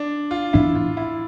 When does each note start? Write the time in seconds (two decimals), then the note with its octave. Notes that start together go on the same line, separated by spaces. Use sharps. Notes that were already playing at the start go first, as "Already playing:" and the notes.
Already playing: D4
0.31 F4
0.53 A2 E3 B3 D4 E4
0.75 F4
0.97 E4